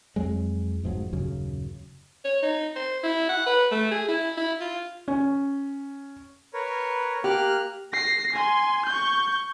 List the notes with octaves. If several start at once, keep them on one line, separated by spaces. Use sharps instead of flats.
F2 F#3 G#3
F1 G#2 F3 F#3
D#1 F#2 C#3
C#5
D#4
C5
E4
F#5
B4
A3
G#4
E4
E4
F4
C#4
A#4 B4 C#5
A#3 G4 F6 F#6
A#6 C7
G#5 C6
C#6 G6